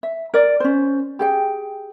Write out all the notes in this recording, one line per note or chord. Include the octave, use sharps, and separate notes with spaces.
E5
A#4 D5
C#4 C5
G4 G#4 G5